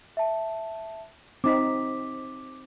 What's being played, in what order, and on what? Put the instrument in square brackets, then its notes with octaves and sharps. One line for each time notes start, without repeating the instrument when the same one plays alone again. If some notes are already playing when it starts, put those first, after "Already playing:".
[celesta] E5 A5
[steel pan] C4 D#4 [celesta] D6 B6